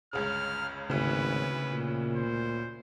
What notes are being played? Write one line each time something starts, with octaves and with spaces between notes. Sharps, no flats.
G1 C#2 C#3 F6
G#1 D2 A2 C#3 B4
A#2
C5